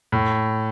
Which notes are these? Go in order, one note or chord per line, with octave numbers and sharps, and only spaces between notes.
A2